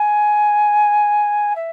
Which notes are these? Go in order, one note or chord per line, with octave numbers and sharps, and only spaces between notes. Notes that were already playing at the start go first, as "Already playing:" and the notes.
Already playing: G#5
E5